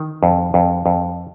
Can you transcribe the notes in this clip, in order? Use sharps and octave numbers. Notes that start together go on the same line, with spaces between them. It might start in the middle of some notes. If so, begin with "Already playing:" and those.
Already playing: D#3
F2
F2
F2